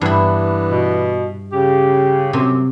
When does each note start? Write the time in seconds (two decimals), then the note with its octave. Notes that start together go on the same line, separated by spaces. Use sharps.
0.01 G2 E3 B3 D4 E4
0.71 B2
1.52 C#3 G4
2.33 F#2 C3